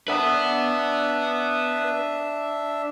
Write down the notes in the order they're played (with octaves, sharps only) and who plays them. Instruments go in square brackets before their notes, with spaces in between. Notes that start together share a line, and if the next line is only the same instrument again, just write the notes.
[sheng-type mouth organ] D4 E5 [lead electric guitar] B4 F#5